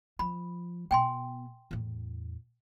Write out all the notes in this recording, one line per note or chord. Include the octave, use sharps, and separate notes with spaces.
F3 B5
B2 B3 G5 G#5 C6
E2 A2